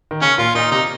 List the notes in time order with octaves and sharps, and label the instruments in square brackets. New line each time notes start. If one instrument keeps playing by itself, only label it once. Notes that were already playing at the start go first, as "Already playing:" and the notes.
[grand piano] D#3
[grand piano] C#3 [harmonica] C#4
[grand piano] A#2 [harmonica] F4
[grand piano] A#2 [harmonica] D#4
[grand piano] C3 [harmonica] D#4